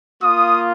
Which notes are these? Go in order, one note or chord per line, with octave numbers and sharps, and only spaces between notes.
A#3 F4 D#6